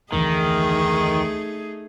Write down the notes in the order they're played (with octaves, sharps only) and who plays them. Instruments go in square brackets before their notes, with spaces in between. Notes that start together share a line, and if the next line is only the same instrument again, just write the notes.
[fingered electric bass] F1 D2 E3 [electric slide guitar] D#3 [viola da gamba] A3 D#4 G#4